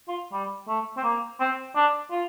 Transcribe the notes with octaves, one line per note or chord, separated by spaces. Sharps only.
F4
G3
A3
C4
A#3
C4
D4
F4